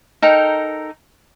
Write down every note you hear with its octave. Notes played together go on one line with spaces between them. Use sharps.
D#4 A4 A#4 G5